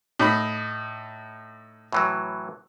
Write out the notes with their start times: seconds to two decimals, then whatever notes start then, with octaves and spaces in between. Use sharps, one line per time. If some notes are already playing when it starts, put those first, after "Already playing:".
0.19 A2 D#4 B5
1.92 A2 E3 F#3